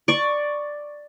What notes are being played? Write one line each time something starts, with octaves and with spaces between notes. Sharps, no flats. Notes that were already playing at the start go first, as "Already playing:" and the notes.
D5 C#6